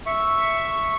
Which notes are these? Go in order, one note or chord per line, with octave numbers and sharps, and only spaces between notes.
E5 C#6